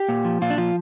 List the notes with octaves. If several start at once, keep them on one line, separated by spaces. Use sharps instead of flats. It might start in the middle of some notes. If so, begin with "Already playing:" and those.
Already playing: G4
A#2
F3
A#2 F4
D4
F3 F4